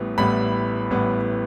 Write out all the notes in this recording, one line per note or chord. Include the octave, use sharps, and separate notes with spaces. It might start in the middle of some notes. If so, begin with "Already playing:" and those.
Already playing: A1 A2 G3 B3
A1 A2 G3 B3 B5
A1 A2 G3 B3